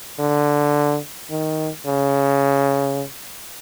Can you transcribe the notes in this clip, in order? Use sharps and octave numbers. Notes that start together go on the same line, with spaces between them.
D3
D#3
C#3